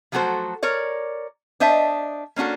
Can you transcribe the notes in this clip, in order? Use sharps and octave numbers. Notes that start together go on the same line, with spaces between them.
F3 F#3 A3 F#4 A4 C5
A#4 C#5 D5
D4 C5 D#5 E5 A5
A#3 C#4 D4 F#4 A4